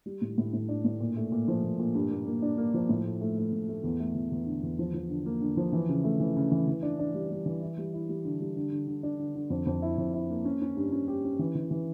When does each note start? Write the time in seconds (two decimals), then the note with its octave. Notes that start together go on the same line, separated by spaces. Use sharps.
0.06 G3
0.22 A2
0.38 A2
0.53 A2
0.69 D4
0.85 A2
1.00 A#2
1.17 A3
1.32 A#2
1.48 F3
1.63 A#2
1.79 A#2
1.95 G2
2.11 A#3
2.26 A#3
2.42 D4
2.58 A#3
2.74 F3
2.89 A2
3.05 A3
3.21 A3
3.37 A3
3.53 A2
3.68 A3
3.84 E2
4.00 A3
4.15 E2
4.32 E2
4.46 D3
4.63 E2
4.79 F3
4.94 F3
5.10 D3
5.26 A#3
5.41 D3
5.57 F3
5.73 E3
5.89 C#3
6.04 A3
6.20 E3
6.36 C#3
6.52 E3
6.68 E3
6.83 D4
6.99 D4
7.14 G3
7.31 G3
7.46 E3
7.62 E4
7.78 G3
7.93 E4
8.09 G3
8.25 D3
8.41 G3
8.56 D3
8.72 D3
8.87 D3
9.03 D4
9.19 D3
9.35 D3
9.50 F2
9.66 F2
9.82 E4
9.98 F2
10.14 E4
10.30 A#3
10.45 C#4
10.62 C#4
10.77 G2
10.92 C#4
11.08 G4
11.25 C#4
11.39 E3
11.55 E3
11.71 E3